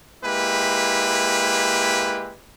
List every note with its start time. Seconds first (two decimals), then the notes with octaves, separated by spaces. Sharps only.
0.23 G#3 A#3 E4 G4 B4